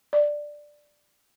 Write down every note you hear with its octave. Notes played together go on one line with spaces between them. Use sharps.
D5